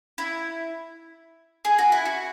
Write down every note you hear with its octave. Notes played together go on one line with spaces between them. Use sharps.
E4
G#4
F#4
E4
F#4